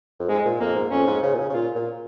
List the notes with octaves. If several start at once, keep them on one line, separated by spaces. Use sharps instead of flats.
F2
G#2 G#3
A#2
F2 A#3
G#2
F2 C#4
G#2
C#3
A#2
C#3
C#3
A#2 F4
A#2